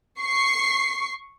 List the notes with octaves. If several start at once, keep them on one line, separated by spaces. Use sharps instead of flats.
C#6 C7